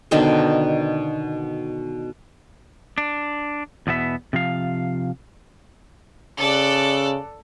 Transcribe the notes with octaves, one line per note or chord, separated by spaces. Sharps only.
B2 D3 D#3 C5
D4
E2 B2 B3 E5
C3 F3 F5
C#3 A4 D5 F#6